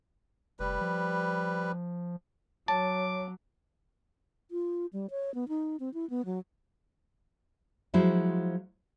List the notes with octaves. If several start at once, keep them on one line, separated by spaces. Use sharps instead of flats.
F1 G3 B4
F3
F#3 C#5 A5 D6
F4
G3
C#5
B3
D#4
C4
E4
B3
F#3
F3 F#3 G#3 E4 F#4 C5